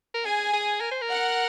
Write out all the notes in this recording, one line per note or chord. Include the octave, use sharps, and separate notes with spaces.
A#4
G#4 G#5
G#4
A#4
C5
A#4
F#5